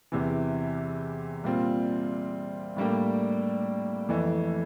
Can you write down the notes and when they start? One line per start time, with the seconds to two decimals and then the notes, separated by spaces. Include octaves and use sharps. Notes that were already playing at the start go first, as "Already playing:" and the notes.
0.12 E2 C3 E3
1.44 A#2 G3 C4 F4
2.76 A2 G3 A#3 D4 G4
4.09 F2 E3 A3